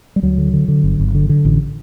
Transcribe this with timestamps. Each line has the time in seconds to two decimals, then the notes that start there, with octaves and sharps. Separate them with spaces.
0.16 G3
0.22 D2 F#3
0.38 D3
0.53 D3
0.68 D3
0.84 G1
0.99 G1
1.15 D3
1.29 D3
1.45 A1